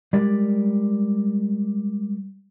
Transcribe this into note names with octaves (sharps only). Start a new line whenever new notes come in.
G3 G#3 G4 A#4 D5